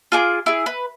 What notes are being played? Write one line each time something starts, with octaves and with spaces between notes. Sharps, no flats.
F4 G#4 D6
E4 G#4
B4